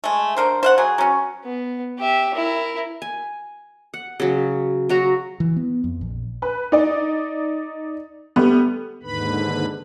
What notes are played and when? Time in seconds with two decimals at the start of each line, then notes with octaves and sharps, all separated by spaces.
0.04 G#3 A3
0.37 D3 A#4 C5
0.63 C5 F5 F#5
0.78 F#3 G#4
0.98 F#3 C#4
1.45 B3
1.99 G4 E5
2.34 E4 A#4
3.02 G#5
3.94 F#5
4.20 C#3 F#3
4.89 F#3 F#4 A#5
5.40 E3
5.56 B3
5.84 F2
6.01 A#1
6.42 B4
6.72 D#4 D5
8.36 G3 A3 B3
9.03 D#2 G#2 D3 B4 B5